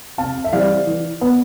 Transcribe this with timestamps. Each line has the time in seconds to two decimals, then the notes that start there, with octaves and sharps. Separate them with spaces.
0.18 C3 F5 A5
0.44 E5
0.53 E3 G3 C4 D5 F5
0.87 E3
1.21 B3